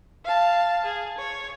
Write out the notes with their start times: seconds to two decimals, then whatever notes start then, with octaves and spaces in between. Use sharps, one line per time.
0.25 F5 A5
0.85 G#4
1.18 C#5